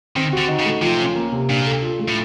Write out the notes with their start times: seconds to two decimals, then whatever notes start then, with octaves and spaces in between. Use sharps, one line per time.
0.16 D#3 C4
0.33 D3 F#4
0.48 D#4
0.60 C#3
0.65 A3
0.82 C3 F3
0.99 C#4
1.15 A#3
1.32 C3
1.49 A#2 D4
1.66 A4
1.82 F4
1.99 A3
2.09 A2